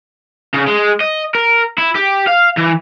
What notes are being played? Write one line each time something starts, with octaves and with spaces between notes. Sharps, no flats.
C#3
G#3
D#5
A#4
E4
G4
F5
E3